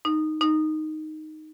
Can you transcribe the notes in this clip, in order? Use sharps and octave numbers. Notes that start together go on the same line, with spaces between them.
D#4
D#4